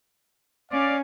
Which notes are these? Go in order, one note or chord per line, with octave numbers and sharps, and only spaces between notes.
C#4 D5 F5